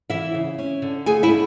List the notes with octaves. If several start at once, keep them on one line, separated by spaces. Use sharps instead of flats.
E3 E4 E5
C#3
C#4
D3
A3 G#4 G#5
E4 E5
D3